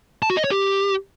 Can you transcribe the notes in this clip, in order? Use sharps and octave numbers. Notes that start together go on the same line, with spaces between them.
A5
F#4
D#5
C#5
G4